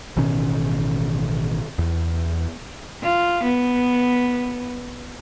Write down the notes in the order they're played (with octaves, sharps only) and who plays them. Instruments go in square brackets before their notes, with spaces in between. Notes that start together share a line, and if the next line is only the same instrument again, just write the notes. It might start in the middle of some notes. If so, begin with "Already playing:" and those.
[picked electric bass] A1 B2 D#3 C#4
E2
[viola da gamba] F4
B3